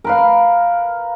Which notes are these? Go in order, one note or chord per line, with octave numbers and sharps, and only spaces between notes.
A#4 B4 F5